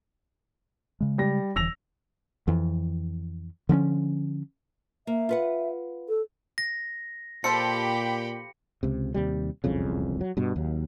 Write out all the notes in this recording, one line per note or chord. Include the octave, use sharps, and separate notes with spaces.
C#3 G#3
G3 A#6
E1 D3 E3 E6 A#6 F7
F2 E3
D3 F3 B3 C#4
A#3 E5
F4 B4 F#5
A4
A#6
A#2 F3 G4 A4 C5 G5 B5 C#7
C#2 C3
D#2 C3 G3
E1 C2 F2 C#3
F#3
G2 B2
D#2 F#3